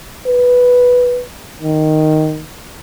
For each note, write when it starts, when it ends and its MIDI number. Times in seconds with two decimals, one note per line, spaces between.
0.26 1.22 71
1.62 2.44 51